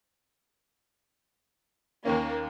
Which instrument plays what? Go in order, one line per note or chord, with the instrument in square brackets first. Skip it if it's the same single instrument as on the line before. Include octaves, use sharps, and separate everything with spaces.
[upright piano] D#2 D#3 C#4 [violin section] A#3